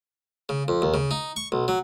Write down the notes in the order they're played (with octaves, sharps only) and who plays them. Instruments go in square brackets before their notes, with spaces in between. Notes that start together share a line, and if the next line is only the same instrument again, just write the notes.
[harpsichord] C#3
F2
D#2
C#3
D#4
C#6
B1
F#3